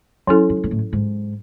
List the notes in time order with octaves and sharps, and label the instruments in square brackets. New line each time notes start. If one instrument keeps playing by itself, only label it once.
[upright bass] F#2 [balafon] F#3 C#4 E4 A4
[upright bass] F#2
G#2
A2
G#2